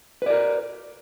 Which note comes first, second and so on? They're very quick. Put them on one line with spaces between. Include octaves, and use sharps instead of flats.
B4 D5 A#4